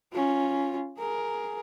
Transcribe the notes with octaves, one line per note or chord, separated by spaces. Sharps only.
C#4 F4
G#4 A#4